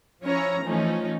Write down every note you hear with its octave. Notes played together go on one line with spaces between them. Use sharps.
F3 C#4 E4 C#5 A#5
E3 F3 A3 C#4 D#4